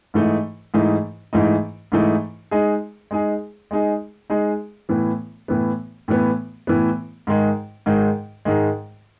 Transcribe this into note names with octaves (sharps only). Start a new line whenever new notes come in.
G#2 E3 A3 D#4
G#2 E3 A3 D#4
G#2 E3 A3 D#4
G#2 E3 A3 D#4
G#3 D#4 G#4
G#3 D#4 G#4
G#3 D#4 G#4
G#3 D#4 G#4
A2 E3 B3
A2 E3 B3
A2 E3 B3
A2 E3 B3
G#2 D#3 G#3
G#2 D#3 G#3
G#2 D#3 G#3